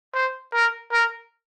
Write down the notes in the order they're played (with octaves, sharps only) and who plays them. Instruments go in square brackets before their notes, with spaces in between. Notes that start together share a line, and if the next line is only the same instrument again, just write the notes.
[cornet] C5
A#4
A#4